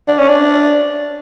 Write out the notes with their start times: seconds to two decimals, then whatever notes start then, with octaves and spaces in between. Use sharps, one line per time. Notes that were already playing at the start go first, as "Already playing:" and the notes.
0.08 D4
0.18 C#4
0.28 D4